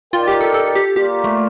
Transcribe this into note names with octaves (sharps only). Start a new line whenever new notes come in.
D#4 F4 A#4 D5 G5
G4
A4
A4
G4
A#3 F4 G4 A#4 D5
A3